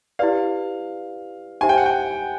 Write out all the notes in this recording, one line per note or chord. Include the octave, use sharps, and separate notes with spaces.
E4 G4 B4 D5 F5
D#4 G4 C5 E5 G#5
G5
F#5
G5